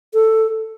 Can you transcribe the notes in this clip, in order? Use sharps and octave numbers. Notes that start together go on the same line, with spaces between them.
A4